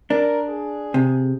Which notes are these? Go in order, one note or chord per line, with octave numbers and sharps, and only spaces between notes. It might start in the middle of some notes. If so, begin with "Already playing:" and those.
D4 A#4
G#4
C3